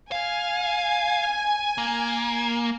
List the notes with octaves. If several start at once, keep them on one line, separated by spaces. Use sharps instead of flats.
F5 G#5
A#3